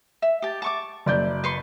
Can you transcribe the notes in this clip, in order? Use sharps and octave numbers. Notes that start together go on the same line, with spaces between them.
E5
G4 A5
A5 C#6 D6
F#1 D5 G6
B4 C6 C#6